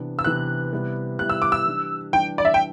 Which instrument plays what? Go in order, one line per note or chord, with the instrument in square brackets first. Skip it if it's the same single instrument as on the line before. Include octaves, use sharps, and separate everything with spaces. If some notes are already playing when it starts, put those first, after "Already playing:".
Already playing: [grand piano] C3 E3 B3 D4
[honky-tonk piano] E6
[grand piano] C3 E3 B3 D4 [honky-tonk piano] F#6
[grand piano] C3 G3 B3 E4
[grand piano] C3 G3 B3 E4 [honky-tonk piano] F#6
[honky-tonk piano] E6
D6
E6
[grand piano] E3 G3 D4
[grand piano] E3 G3 D4 [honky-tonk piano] G5
[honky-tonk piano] D5
E5
G5